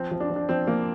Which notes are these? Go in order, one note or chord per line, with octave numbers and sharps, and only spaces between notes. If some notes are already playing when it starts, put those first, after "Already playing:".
Already playing: F3 C4
F3
D4
F3
D4
F3 C4
F3 A#3